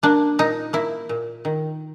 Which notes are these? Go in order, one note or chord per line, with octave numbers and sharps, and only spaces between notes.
A#3 D4
A#2 D#4
A#3 E4
A#2
D#3